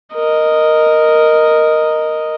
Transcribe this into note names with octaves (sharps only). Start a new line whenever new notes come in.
A#4 D#5